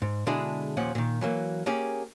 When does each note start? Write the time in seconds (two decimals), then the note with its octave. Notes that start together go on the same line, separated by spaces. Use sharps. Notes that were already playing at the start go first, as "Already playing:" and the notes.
0.02 G#2
0.26 B2 D3 G#3 D4 E4 G#4
0.77 D#2 A#2 F3 C#4 F#5
0.95 A#2 D#3
1.21 E3 F#3 A#3
1.66 A#3 C#4 G4 G#4